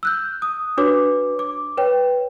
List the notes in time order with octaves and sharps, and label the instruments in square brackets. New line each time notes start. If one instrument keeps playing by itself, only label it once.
[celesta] E6 F#6 G6
D#6
D4 F#4 B4 C#5 D6
D6
B4 C#5 G5